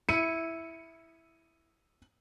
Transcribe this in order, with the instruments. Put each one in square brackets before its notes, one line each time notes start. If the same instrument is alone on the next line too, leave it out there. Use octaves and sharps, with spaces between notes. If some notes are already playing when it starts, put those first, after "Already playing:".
[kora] E4 [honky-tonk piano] C#7 D#7